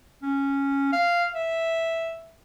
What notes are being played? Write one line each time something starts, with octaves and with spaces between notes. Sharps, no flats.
C#4
F5
E5